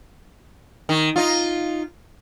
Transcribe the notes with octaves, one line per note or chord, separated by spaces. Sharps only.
D#3
D#4 F4